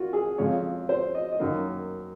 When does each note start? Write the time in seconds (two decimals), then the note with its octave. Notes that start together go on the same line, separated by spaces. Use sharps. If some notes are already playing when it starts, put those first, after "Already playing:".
Already playing: A#3 F4 F#4
0.13 G#4
0.38 F2 C#3 G#3 C#5
0.89 C5
1.15 D#5
1.32 D#5
1.40 F#2 D#3 A#3